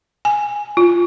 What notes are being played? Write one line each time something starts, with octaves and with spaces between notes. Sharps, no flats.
G#5
F4